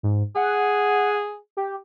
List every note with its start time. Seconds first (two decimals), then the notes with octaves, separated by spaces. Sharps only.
0.03 G#2
0.36 G#4 F#5
1.57 G4